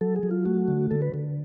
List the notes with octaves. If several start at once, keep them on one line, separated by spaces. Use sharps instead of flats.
F#3 A4
G#4
F#3
F4
A3 F#4
D3
D3 A4
B4
D3